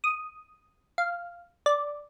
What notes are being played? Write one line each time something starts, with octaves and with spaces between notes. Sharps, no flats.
D#6
F5
D5